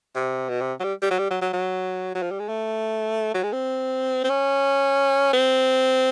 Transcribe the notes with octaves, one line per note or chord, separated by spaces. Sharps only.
C3
B2
C3
F#3
G3
G3
F#3
G3
F#3
F#3
F#3
F#3
F3
G3
G#3
A3
F#3
G#3
C4
C4
C#4
C4